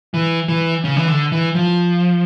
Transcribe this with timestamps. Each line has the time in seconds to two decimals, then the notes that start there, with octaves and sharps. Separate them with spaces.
0.14 E3
0.48 E3
0.84 C#3
0.97 E3
1.08 D3
1.32 E3
1.55 F3